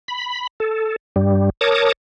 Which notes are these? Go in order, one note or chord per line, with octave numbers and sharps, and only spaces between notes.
B5
A4
G2 G3
A#4 C#5 A5 D6 D#6